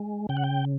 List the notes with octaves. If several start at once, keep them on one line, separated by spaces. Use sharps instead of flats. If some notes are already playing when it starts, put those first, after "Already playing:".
Already playing: G#3
C#3 G5
F#5
G5